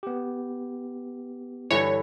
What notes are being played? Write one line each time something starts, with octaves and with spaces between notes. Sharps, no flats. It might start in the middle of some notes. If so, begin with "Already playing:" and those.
B3 G4
G2 D3 E3 C#5